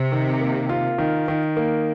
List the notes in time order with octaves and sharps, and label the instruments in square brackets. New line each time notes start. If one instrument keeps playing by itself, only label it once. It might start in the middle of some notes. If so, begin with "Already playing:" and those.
Already playing: [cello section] C3
[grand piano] D#3
A#3
F4
D#3
D#3
A#3